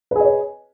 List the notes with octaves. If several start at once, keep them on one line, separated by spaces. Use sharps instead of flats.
G#4 B4 C#5 D#5